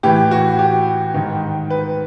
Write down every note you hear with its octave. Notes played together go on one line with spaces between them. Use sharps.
A2 E3 G4
F#4
G4
G#2 D#3
B4